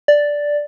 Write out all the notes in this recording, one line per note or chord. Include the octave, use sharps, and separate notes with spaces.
D5